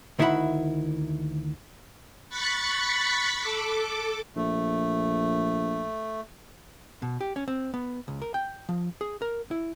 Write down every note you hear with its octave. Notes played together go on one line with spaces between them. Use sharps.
D2 D#3 E4 E5 F#5 B5
B5 C#6 F#6 A6 B6 C#7
A4 D6
A#1 A3
B2
G4
C#4
C4
B3
C#2
A#4
G5
F3
G#4
A#4
E4